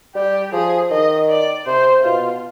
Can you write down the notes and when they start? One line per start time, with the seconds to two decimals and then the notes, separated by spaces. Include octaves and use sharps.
0.15 G3 G4
0.52 F3 G#4
0.91 D#3 D#5
1.29 D5
1.66 C3 C5
2.04 B2 F4